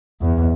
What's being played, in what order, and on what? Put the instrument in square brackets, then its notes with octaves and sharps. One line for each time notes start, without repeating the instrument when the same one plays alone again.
[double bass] E2